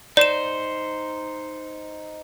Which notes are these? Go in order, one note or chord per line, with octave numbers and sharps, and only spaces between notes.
D#4 C5 D5 E7